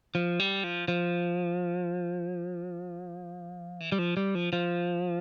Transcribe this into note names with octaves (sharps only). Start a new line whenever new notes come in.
F3
G3
F3
F3
E3
G3
F3
G3
F3
F3